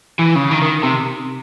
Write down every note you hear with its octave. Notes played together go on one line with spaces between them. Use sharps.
E3
C#3
D#3
D#3
C3